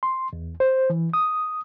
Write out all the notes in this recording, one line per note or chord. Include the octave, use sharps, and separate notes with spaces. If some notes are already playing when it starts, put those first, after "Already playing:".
C6
E2
C5
E3
D#6